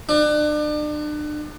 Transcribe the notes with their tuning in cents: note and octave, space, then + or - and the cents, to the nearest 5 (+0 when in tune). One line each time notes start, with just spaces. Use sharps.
D4 +35